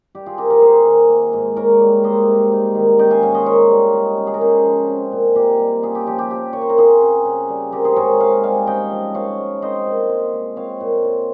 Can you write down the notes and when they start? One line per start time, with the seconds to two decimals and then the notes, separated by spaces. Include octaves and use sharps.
0.15 G3 G4
0.26 F4 G#4
0.38 C3 G4 A#4
0.50 G4 A#4
0.62 A#3 G#4 C5
0.85 D#3
1.10 A#3
1.33 G#2
1.57 G#2 A#4 C#5
1.80 G3
2.04 A#3 C5 D#5
2.28 C3
2.52 D#4
2.75 D#3
2.99 C#4 D#5 G5
3.11 F5 G#5
3.22 G#2 C#5 F5
3.34 C5 D#5
3.46 F4 A#4 C#5
3.70 G3
3.93 G#3
4.17 C#3
4.27 G#4
4.34 A#4
4.41 C#4 G#4 C5
4.64 F3
4.88 C4
5.12 A#2
5.36 A#2 G4 A#4
5.59 G3
5.83 C#4 F4 G#4
5.95 G4
6.07 F3 G4
6.19 G4
6.31 F4 G4
6.53 A#3 C#5
6.61 C5
6.70 A#4
6.77 C4 F4 G#4
7.01 C#3
7.25 C#3
7.49 G3
7.72 C4 G4 A#4
7.85 G#4 C5
7.96 G#2 A#4 C#5
8.20 G#2 C#5 F5
8.43 G3 F5 G#5
8.67 C#4 D#5 G5
8.91 F3
9.15 F4 C#5 F5
9.38 G#3
9.62 C4 C5 D#5
9.86 A#2
10.09 F4
10.33 G#3
10.56 C4 C#5 F5
10.80 A#2
11.05 F4